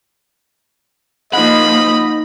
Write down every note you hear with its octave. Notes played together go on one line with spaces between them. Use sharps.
F3 A#3 D#4 D#5 F#5 B5